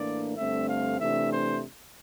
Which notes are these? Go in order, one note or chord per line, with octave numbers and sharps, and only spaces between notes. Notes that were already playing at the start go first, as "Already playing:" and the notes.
Already playing: A2 E3 A#3 D4 D5
G2 D3 A3 C4 E5
F5
C3 E3 A3 D4 E5
C5